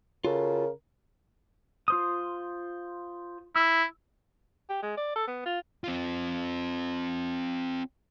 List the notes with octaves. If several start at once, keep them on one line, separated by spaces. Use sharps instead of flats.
C#3 F4 F#4 A4 A#4
F4 C5 D#6
E4 E6
G4
G#3
D5
A4
B3
F4
C4 F4